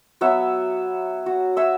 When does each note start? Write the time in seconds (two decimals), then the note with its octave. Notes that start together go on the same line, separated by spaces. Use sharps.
0.21 F#3 B3 C#5 E5
1.26 F#4
1.57 F#4 C#5 E5 E6